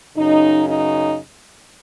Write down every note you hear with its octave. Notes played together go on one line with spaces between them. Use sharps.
F#2 C#3 D#4
D#4